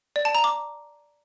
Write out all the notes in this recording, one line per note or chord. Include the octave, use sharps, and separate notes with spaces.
D5
A5
A#5
D6